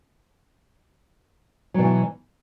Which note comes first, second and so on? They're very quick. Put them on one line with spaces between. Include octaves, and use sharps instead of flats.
F#3 B2 E3